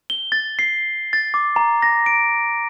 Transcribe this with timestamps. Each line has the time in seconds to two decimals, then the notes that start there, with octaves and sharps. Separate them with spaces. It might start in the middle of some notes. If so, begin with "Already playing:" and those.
0.10 G7
0.32 A6
0.59 C7
1.13 A6
1.34 D6
1.56 A#5
1.82 A#6
2.06 D7